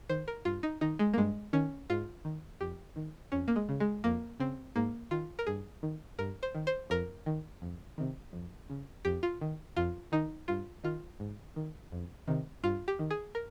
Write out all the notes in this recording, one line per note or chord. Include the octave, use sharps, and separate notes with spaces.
D#3 C5
A#4
G2 F4
D#4
D#3 D#4
G#3
A#3
G2 G#3
D#3 C#4
G#2 F4
D#3
F2 G4
D#3
F2 C#4
A#3
G#3
C#3
G#3
F2 A#3
C#3 C4
G#2 A#3
D#3 F4
A#4
G2 G#4
D#3
G2 A#4
C5
D#3
C5
F2 A#4
D#3
F2
C3 D#3
F2
C#3
F2 G4
F4
D#3
F2 F4
D#3 D#4
G2 F4
D#3 F4
G#2
D#3
F2
C3 D#3
G2 F4
G4
D#3
G#4
A#4